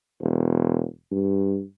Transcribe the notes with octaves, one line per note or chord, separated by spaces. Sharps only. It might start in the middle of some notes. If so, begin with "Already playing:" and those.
E1
G2